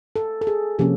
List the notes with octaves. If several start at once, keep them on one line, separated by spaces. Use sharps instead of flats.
A4
A4
G#4
C3 F3 A#3 C#4 G4